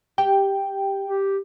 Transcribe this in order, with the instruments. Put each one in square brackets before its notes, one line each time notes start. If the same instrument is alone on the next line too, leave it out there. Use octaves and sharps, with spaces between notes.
[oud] G4 [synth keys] G5
[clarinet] G4